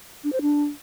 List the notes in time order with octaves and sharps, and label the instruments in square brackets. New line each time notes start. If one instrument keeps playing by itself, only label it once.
[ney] D4
C5
D4